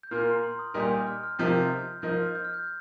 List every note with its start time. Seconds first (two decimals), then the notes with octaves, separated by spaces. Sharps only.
0.03 G6
0.11 A#2 A#3 F4 A#4 F6
0.21 C6
0.32 A#5
0.44 C6
0.59 D#6
0.74 A#2 G3 D#4 G4 A#4 D#6
0.91 G6
1.07 F6
1.23 F6
1.39 C3 F3 D#4 G4 A#4 F6
1.52 G6
1.66 F6
2.02 F3 D#4 A#4 G6
2.18 F6
2.35 G6
2.44 F6
2.54 G6